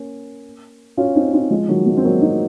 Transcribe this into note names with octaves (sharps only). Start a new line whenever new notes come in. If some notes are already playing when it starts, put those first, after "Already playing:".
Already playing: A#3 C#4
C#4 F4
C4 D#4
C4 D#4
F3 G#3
D#3 F#3
F3 G#3
C4
F#3 A#3
C4 D#4